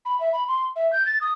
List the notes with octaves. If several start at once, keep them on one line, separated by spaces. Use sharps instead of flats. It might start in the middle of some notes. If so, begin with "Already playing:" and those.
B5
E5
B5
C6
E5
G6
A6
D#6